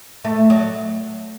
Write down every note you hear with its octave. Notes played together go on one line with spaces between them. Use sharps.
A3
F#3